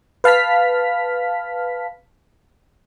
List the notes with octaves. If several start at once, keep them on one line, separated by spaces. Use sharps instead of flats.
B4 F5 A5 F6 B6